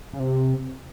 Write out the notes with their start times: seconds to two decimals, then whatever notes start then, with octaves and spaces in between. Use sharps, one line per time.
0.14 C#3
0.20 C3